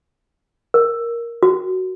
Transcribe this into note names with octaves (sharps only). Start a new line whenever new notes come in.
A#4
F#4